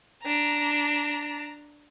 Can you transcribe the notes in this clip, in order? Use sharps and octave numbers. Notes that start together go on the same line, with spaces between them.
D4 A#5